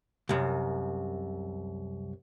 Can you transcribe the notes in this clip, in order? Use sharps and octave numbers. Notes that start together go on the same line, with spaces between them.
C2 F#2